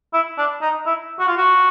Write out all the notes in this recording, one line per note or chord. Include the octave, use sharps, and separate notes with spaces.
E4
D4
D#4
E4
F#4
F4
F#4